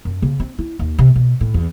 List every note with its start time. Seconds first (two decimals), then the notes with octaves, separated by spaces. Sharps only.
0.05 F#2
0.22 C#3
0.40 C4
0.59 E4
0.79 D#2
0.99 C3
1.16 B2
1.41 A2
1.54 E2